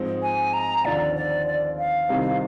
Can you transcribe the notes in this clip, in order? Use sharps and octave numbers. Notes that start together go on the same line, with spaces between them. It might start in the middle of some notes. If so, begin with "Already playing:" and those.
Already playing: G#2 F3 G#3 C4
G#5
A#5
D#2 D3 F3 C4 F4 D5
D5
D5
F5
C2 C3 D#3 G3 C4